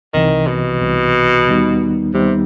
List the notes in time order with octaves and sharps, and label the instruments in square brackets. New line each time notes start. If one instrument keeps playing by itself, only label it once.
[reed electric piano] C2 C3 E3 [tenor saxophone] D#3
[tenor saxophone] B2
[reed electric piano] C2 C3 E3
D#2 D#3 G3 B3 D#4
[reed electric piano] D#2 D#3 G3 B3 D#4 [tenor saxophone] C3